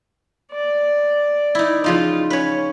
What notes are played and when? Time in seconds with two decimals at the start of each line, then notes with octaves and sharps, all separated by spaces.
0.52 D5
1.55 D#4 E4
1.84 C#3 F3 D#4 F4
2.30 C#4 B4 C#5